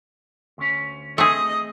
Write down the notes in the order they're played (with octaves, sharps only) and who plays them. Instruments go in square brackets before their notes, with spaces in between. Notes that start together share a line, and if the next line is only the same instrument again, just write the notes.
[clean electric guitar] D2 C#4
[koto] A3 C4 G#4 [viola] D#5